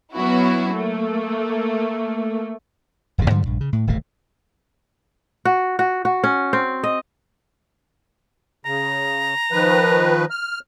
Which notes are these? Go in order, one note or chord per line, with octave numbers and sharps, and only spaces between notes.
F#3 B3 C#4 E4 F#4
A3 A#3
D1 G#1 F2 C3
G2 D3 F#3 G3
A#1 G2
C#3
A2
D1 G#1 B2 A3
F#4
F#4
F#4
C#4
C4
D#5
C#3 A#5
D#3 F3 B4
F6